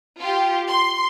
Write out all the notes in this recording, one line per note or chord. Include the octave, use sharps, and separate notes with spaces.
F4 G4
C6